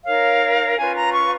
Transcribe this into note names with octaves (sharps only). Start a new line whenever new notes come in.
D#4 A#4 C#5 F5
C#4 F4 B4 G#5
A#5
C#6